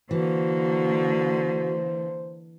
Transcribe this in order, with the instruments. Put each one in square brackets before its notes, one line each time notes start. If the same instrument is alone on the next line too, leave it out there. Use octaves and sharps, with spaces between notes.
[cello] D3 A#3 [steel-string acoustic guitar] E3 [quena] F#4 [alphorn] C5